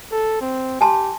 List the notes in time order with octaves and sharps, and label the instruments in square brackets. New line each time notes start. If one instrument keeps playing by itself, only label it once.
[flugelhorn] A4
C4
[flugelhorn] G4 [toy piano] G#5 A5 C6